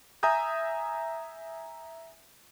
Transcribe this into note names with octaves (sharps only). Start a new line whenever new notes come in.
E5 G#5 A#5 D#6 G6